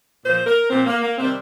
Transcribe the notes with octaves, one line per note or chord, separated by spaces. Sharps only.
A#2 F3 C5
A#4
A#2 F3 C4
A#3
A#3
C3 D#3 G3 C4